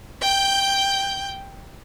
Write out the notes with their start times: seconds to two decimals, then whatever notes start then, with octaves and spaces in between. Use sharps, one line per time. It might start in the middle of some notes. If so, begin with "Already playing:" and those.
0.22 G5 G6